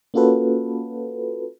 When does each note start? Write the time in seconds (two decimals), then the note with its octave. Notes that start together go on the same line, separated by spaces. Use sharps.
0.14 A#3 C#4 F4 F#4 A4 B4